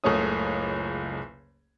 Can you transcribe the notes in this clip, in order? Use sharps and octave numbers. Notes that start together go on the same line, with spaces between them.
F#1 C#2 A3 C#5 D#6